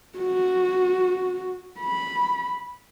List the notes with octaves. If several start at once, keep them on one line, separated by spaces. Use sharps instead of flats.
F#4
B5